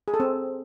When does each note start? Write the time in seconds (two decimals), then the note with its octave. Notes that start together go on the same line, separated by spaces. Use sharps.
0.08 G#4
0.14 A4
0.20 C4